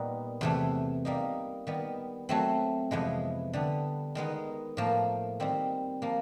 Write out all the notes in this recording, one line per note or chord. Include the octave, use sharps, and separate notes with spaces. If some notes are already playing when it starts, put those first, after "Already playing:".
Already playing: A#2 G3 B3 D#4
E2 C3 E3 A3
G3 A#3 D#4
D#3 G3 B3
F#3 A3 C4
F2 C3 E3 G#3 B3
D3 G3 B3
D#3 G#3 B3 D#4
A2 F3 A#3
D#3 G3 C4
F3 A#3